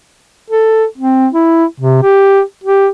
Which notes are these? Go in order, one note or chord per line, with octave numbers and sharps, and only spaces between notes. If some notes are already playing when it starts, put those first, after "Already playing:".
A4
C4
E4
C3
G4
G4